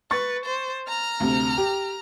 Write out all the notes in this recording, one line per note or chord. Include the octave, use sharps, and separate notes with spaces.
B4 C#6 A6
C5
A#5 F6
D2 C3
G4